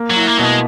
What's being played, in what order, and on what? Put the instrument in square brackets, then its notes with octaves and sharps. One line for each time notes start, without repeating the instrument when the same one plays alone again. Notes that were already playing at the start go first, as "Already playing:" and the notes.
Already playing: [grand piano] A#3
[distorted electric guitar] F#3
[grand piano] E4
[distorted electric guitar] A#3
[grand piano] B2 [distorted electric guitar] F#3
[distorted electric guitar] G#3